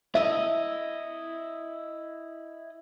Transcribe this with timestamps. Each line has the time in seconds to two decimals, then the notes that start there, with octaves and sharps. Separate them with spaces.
0.15 E4 D#5 E5